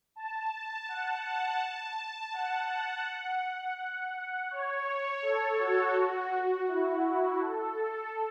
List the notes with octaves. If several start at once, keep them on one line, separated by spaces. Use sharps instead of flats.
A5
F#5
A5
A5
F#5
C#5
A4
F#4
E4
F#4
A4